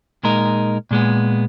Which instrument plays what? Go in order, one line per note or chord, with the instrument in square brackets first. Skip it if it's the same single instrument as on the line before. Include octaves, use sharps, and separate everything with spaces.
[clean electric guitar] A#2 G#3 D#4 A#4
A#2 G#3 B3